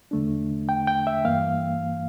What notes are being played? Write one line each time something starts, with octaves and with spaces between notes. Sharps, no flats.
E2 D3 A3 D4
G5
G5
E5
G2 E3 A#3 F5